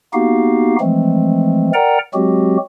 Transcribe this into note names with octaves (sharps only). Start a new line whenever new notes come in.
A#3 B3 D#4 F#4 G4 F5
E3 F3 G#3 A3 C4
A#4 D5 F#5 G5 A#5
F#3 G#3 C4 F#4 G4